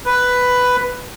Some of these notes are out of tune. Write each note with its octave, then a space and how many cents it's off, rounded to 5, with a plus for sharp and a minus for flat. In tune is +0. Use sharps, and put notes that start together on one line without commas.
B4 +5